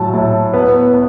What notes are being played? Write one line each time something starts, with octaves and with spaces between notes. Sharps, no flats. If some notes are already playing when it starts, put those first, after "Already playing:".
Already playing: A2 F#3 A5
A2
B3
B3